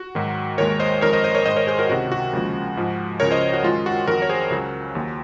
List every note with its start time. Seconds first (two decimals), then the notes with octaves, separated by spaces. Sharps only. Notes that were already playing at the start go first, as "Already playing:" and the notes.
Already playing: F#4
0.15 G#2 D#3 F#3
0.58 D#2 D#3 G#3 A#4 C#5
0.80 C5 D#5
1.01 F2 D#3 G#3 A#4 C#5
1.13 C5 D#5
1.24 C5 D#5
1.35 A#4 C#5
1.45 G#2 D#3 G#3 C5 D#5
1.56 A#4 C#5
1.67 G#4 C5
1.79 F#4 A#4
1.90 C#2 C3 D#3 F#4
2.12 F#4
2.33 D#2 C#3 F3 G#3
2.77 G#2 F3 G#3
3.20 C#2 C#3 F3 A#4 C#5
3.31 C5 D#5
3.53 F#4
3.63 F#2 D#3 G#3 F4
3.86 F#4
4.07 F2 D#3 F#3 F#4 A#4
4.22 C#5
4.29 G#4 C5
4.51 C#2 C#3 F#3
4.95 D#2 D#3 F#3